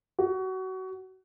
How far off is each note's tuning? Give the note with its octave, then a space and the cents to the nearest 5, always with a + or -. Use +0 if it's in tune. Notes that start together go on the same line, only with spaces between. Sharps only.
F#4 +25